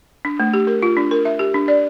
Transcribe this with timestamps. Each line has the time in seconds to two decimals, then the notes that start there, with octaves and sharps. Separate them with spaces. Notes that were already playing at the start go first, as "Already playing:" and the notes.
0.25 D4
0.40 A3
0.53 G4
0.67 A#4
0.82 F4
0.97 D4
1.11 A#4
1.25 E5
1.39 G4
1.54 D4
1.68 D5